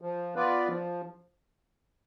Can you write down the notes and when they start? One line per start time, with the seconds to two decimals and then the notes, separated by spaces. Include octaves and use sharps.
0.02 F3
0.35 B3 F4 B4 D5
0.68 F3